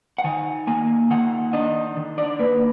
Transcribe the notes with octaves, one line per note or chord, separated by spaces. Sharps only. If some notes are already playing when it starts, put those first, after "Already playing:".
F#5
D#3 G#5
A#3 G#5
D#3 F#5
D4 D#5
D#3
D5
A#3 B4